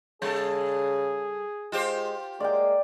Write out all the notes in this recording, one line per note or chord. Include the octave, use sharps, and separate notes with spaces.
C#3 G3 G#4 A4
G#3 F4 G4 C5
G#3 A#3 D5 G5